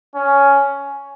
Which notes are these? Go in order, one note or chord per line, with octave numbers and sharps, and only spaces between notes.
C#4